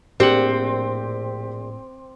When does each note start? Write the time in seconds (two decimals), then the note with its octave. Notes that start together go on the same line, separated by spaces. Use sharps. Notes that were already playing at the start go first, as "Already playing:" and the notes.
0.20 A#1 A2 A#3 C4 D4 G4 F#5